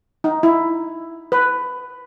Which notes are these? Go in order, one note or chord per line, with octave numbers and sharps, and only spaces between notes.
D#4
E4
B4